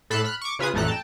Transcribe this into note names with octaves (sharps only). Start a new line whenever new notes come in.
A2 A4 B5 F#6 C7 E7
B5 F6 F#6
C#6 D6
C#3 F4 B4 G#5 D#6
A1 F2 A3 A4 A#5 F#6
G5 A5